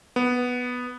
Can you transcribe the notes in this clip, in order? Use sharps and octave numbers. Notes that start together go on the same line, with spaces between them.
B3